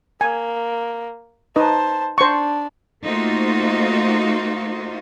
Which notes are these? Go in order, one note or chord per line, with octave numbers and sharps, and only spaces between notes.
A#3 G#5
D#4 B4 C5 D#5 A5
D4 C5 C#6
A3 A#3 D#4 F4 F#4 C5